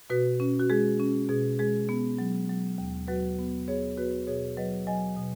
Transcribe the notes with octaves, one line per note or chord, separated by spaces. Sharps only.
B2 F#4 B4
C#4
F#4
G#3 G#4
C#4
B2 G#4
G#3 G#4
B3
F#3
F#3
D#2
F#3 F#4 B4
B3
B3 G#4 C#5
B3 F#4 B4
B2 G#4 C#5
F#3 B4 D#5
F#3 D#5 G#5
B2